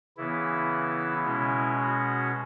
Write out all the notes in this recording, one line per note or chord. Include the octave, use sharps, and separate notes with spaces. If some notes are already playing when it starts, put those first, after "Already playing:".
C#3 E3 B3 E4
B2 G#3 C#4 E4
F#4